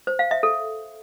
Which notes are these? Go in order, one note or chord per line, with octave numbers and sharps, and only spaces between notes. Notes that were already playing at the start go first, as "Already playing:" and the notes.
C5
F5
E5
A4